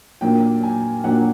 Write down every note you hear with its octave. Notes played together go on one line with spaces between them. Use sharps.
A#2 F#3 A#3 D4 G5
G#5
A#2 F#3 A#3 D4 F#5